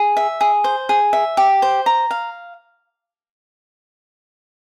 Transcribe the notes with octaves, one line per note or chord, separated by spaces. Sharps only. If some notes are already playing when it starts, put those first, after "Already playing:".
Already playing: G#4
E5
G#4
C5
G#4
E5
G4
C5
A#5
F5